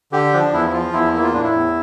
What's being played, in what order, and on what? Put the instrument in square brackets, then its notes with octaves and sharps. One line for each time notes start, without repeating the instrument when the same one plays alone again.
[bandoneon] D3 G4
F3 D4
E2 E4
E4
F3 F4
E2 E4
A#3 E4
F4
A2 D4
E4
E2